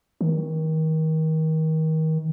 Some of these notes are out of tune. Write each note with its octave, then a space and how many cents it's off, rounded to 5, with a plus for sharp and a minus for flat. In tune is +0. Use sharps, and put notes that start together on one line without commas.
D#3 +30